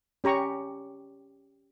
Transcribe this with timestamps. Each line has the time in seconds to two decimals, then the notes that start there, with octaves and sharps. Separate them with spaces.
0.24 C#4 G4 A#5 C#6